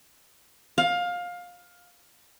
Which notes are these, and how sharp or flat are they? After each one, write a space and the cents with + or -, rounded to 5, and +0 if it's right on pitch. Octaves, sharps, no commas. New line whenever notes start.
F5 +20